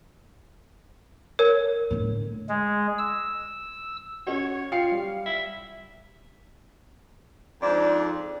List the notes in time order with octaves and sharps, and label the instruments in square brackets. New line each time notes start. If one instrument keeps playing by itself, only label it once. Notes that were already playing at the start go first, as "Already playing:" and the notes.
[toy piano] A#4 [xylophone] C#5
[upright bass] A2 D3
[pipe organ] G#3
E6
[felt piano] C#4 F#4 [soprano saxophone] C#5
[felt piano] F4 G5 C#7 [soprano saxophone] F5
[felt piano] G3
[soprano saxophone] E5
[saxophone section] F2 G#2 D4